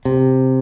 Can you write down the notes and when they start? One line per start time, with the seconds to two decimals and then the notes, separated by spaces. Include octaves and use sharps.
0.05 C3